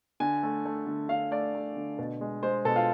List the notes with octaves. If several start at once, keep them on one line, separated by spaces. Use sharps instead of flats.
D3 G#5
A3
A3
D3
D3 F5
A3 D5
A3
D3
B2
G#3
G#3 C5
B2 A4
F4